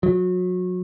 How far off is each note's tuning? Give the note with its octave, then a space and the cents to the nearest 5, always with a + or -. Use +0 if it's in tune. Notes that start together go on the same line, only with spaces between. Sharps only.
F#3 -30